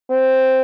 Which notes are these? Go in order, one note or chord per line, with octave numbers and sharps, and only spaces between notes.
C4